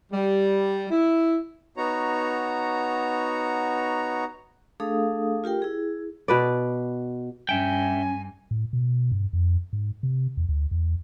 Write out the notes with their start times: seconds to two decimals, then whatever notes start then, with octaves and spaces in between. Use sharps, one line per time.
0.12 G3
0.91 E4
1.77 B3 D#4 F#4 C#5 A#5
4.80 A3 D4 G#4 A4 F5 D#6
5.44 F4 G4 A#4 G5
5.62 E4 G#4
6.28 B2 B4 D5
7.49 G2 C#4 E5 G5 G#5
8.51 A2
8.73 B2
9.12 G2
9.33 F2
9.73 G#2
10.03 C3
10.37 E2
10.49 D2
10.71 E2